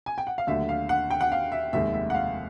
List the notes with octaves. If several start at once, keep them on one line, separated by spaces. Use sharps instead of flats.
G#5
G5
F#5
F5
D#2 D3 F#3 A3 E5
F5
F#5
G5
F#5
F5
E5
F1 D#2 D#3 G#3 E5
E5
F#5
F5